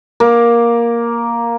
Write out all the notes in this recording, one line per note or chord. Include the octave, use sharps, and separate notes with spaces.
A#3